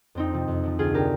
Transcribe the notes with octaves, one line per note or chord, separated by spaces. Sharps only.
F2 C4 D#4
C3 F3
F2
C3 F3
D2 F4 G#4
D3 F3 G4 A#4